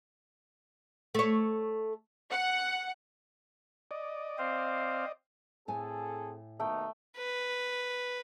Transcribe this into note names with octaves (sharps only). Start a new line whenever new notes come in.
A3 C#5
F#5
D5 D#5
C4 C5 F5
A2 C4 G#4 A4 G#5
D#2 B2 A3 D#4 G5
B4